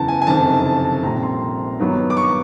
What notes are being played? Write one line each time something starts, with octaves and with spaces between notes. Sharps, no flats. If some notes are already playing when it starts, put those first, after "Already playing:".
Already playing: F#1 E2 C#3 A5 A#5
G#5
G#5
F#1 F2 C3 D#3 A5
A5
A#1 A#2 G3 C4 A#5
C6
G2 D#3 F#3 B3
D6
C#6